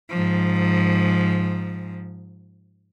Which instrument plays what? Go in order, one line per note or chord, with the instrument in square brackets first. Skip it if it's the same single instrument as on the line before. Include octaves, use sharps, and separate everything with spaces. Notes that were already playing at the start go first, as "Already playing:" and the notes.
[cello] G#2 F3